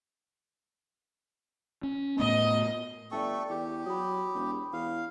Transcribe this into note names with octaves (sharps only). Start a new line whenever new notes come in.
C#4
A2 A3 B3 D#5
G1 A3 A4 D5 G5 C#6
E2 G4
F#3 B5 D#6
E1
E2 F5